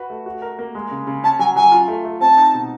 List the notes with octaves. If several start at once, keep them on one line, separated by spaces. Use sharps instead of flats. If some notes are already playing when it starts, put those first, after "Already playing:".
Already playing: F#4 B4
A3
F#4
A#4
A#3
G#3
C#3
C#3
C#4 A5
F#3 G#5
F#3 G#5
F4
A3
A3
C4 A5
D#4
B2